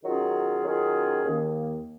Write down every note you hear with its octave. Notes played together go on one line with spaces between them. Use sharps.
D#3 F#3 C#4 F4 G#4
D#3 F#3 C#4 F4 G#4
D#2 D#3 A#3